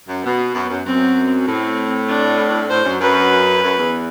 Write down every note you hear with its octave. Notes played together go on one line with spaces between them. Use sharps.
F#2
B2 B3
F#2
F#2
F#2 C4
A2 C4
D4
A2 C5
F#2
F#2 B4
F#2
E2